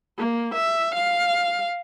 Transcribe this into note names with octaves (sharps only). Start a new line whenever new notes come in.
A#3
E5
F5